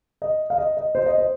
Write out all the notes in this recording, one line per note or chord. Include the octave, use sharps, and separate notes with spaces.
D#5
F5
D#5
D#5
C5
D#5
C5